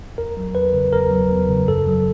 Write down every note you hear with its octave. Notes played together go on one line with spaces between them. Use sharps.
E2 A#4
F#3
E2 B4
C#3
E2 A#4
F#3
E2
C#3
F#2 A4
F#3